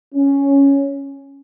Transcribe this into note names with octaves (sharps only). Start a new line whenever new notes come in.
C#4